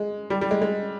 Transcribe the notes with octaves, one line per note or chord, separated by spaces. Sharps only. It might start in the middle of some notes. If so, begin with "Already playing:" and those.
Already playing: G#3
G3
G3
G#3
G#3